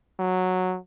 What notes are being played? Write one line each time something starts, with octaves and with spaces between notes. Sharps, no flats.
F#3